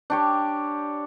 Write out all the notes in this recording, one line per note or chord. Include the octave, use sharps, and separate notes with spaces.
D4 G4 C#5